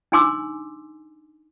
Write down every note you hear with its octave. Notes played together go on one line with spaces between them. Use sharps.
D4 D#4 G#5 C6 D6 E6